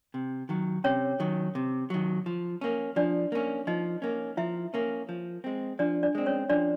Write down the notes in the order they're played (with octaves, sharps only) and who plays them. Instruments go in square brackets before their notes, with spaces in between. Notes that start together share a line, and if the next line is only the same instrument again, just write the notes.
[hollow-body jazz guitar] C3
D#3 F#3
[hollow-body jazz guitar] C3 [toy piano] C#4 C#5
[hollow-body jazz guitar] D#3 F#3
C3
D#3 F#3
F3
A#3 C#4
[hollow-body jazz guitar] F3 [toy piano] D4 D5
[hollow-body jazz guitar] A#3 C#4
[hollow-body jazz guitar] F3 [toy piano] D#4 D#5
[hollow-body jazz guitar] A#3 C#4
[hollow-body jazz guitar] F3 [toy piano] E4 E5
[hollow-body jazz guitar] A#3 C#4
F3
G#3 C4
[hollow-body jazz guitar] F3 [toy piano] D4 D5
[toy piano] D4 D5
[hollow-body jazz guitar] G#3 C4
[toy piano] C#4 C#5
[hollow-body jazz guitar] F3 [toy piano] D4 D5